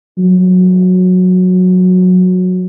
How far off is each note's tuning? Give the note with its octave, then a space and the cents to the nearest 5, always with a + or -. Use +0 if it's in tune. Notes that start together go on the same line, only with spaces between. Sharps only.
F#3 -15